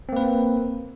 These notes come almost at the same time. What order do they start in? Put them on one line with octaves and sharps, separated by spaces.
C4 A#3 B4